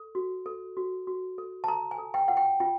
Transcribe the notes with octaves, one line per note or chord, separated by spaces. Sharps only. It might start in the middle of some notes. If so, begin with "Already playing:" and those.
Already playing: A4
F#4
A4
F#4
F#4
A4
A5
A4 A#5
G#5
A4
G5
F4 F#5
G5
F4 G5